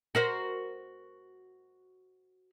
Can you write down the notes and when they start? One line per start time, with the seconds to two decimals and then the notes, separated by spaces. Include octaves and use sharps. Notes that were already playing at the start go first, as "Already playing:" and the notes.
0.15 F#4 A#4 C5